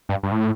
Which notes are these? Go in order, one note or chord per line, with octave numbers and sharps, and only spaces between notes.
G2
G2
A2